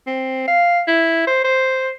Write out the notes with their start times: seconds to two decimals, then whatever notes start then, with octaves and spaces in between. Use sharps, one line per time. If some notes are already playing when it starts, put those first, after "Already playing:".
0.07 C4
0.47 F5
0.88 E4
1.27 C5
1.44 C5